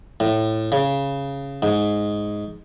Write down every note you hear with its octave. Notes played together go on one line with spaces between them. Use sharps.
A2
C#3
G#2